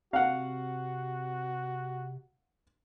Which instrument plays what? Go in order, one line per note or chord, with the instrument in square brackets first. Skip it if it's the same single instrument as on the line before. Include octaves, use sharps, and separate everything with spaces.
[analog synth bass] C3 [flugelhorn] F#4 [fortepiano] F5 F#5